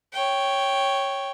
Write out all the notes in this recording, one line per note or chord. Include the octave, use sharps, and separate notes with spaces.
C#5 G5